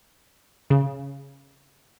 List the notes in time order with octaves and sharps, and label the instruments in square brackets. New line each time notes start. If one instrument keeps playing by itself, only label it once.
[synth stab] C#3